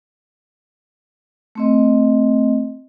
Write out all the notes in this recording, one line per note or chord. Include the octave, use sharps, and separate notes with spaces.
A3 C4 D#5